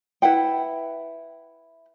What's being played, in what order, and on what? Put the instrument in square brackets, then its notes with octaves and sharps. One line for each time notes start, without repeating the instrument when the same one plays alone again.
[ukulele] E4 B4 F#5 G5